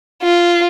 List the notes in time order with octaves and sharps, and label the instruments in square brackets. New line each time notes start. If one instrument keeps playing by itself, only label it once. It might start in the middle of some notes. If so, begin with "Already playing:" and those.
[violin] F4